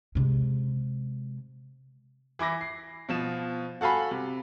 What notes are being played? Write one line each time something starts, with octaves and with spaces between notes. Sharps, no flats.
C3 G#3
E3 E4 D6 A#6
C7
B2 F3 E7
F#4 A4 F5 G#5 B5
C3